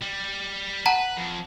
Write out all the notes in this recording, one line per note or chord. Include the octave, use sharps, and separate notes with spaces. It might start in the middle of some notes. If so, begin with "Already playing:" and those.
G3
B4 F#5 A5 A#5
F2